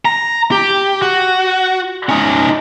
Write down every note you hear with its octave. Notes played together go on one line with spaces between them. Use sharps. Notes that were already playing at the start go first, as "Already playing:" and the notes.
A#5
G4
F#4
C#4 D#4